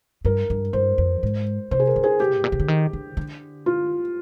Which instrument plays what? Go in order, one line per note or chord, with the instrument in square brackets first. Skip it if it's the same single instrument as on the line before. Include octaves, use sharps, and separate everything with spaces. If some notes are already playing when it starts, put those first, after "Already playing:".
[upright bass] G2 [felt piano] A#4
[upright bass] G2
[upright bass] G2 [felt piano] C5
[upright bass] F2
G#2
[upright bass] C3 [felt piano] C5
[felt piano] G#4
A#4
[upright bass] D3
[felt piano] G#4
G4
[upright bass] G#2
A#2
C3
D3
D#3
D3
D3
[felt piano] F4